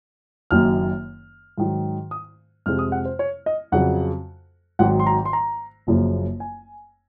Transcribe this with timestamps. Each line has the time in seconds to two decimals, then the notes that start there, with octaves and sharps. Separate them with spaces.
0.51 F#1 F#2 D#3 F#3 A#3 F6
1.58 G#2 D#3 F#3
2.11 D#6
2.66 F2 C3 F3 G#3 C4 F6
2.79 D#6
2.92 F#5
3.05 C5
3.19 C#5
3.46 D#5
3.72 F2 C#3 F#3 F#5
4.79 G#1 G#2 D#3 F#3 F#5
4.99 C6
5.07 A#5
5.25 C6
5.33 A#5
5.87 F#1 F#2 C#3 F3 A#3
6.40 G#5